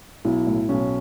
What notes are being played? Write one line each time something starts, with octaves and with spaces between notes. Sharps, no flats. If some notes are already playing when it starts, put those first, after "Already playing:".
B1 E4
A2
B1 C#4